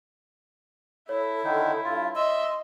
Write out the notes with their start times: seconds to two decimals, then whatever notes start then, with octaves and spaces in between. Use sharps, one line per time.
1.09 E4 A4 C#5
1.44 D3 D#3 D#4
1.84 G2 F4
2.16 D#5 E5 C6 E6